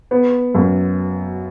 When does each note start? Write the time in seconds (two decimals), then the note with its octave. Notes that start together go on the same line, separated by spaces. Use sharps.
0.11 B3
0.55 F#2